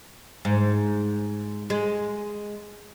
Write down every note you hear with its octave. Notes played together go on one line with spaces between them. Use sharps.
G#2
G#3